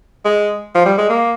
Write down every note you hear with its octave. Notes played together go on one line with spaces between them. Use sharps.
G#3
F3
G3
G#3
A#3